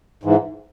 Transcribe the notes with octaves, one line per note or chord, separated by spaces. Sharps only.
G#2 E3